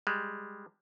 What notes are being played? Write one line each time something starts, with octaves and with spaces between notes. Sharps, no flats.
G3 G#3